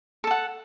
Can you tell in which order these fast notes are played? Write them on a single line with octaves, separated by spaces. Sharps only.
A4 A5 F#5